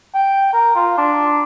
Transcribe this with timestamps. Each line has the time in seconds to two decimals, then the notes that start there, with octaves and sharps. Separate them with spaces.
0.14 G5
0.53 A#4
0.75 F4
0.98 D4